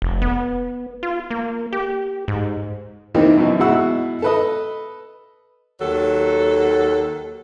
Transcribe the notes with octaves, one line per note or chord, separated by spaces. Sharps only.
F1
B3
F4
A#3
G4
G#2
C3 D#3 E3 A#3 C4 D#4
F#2 B2 E3 F#3
B2 G#3 E4 F#4 F#5 E6
A4 B4 D#5
D#2 F#3 A4